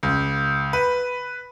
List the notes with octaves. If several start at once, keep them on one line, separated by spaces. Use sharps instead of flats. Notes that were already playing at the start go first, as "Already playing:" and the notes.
C#2
B4